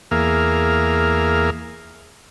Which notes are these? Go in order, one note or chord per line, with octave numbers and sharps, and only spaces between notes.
E2 A#3 G#4 A#4 E5 F5